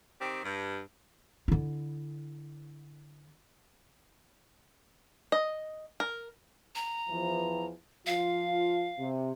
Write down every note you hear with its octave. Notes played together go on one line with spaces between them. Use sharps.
D#3 C4 G4
G2
D3 E4
D#5
A#4
A#5
E2 E3 F3
F3 F4 F5
C3